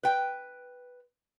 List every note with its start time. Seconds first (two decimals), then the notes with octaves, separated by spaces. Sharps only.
0.03 B4 G5